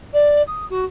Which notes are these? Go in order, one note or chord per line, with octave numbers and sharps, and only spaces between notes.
D5
D#6
F#4